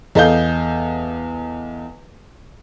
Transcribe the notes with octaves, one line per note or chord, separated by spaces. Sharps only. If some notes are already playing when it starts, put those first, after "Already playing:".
E2 A4 D#5 F5 G6